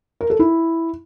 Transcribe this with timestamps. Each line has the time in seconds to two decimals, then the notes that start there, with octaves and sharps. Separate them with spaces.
0.21 A#4
0.30 A4
0.39 E4